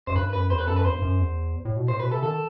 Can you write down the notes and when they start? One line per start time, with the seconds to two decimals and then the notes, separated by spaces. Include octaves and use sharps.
0.07 F#2 C5
0.15 G2 B4
0.33 F#2 B4
0.50 E2 C5
0.59 B4
0.67 F#2 A4
0.76 B4
0.85 E2 C5
0.95 G2
1.02 F#2
1.20 E2
1.65 A2
1.77 B2
1.88 A2 C5
1.99 B2 B4
2.11 C3 A4
2.22 D#3 A4